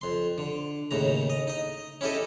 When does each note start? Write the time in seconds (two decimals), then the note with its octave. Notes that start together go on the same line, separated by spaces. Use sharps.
0.01 F2 C6
0.38 D3
0.91 D#2 A2 C#3 A#5
1.30 D#5
1.47 D#4 D#5
2.01 C#4 E4 G4 A4 D#5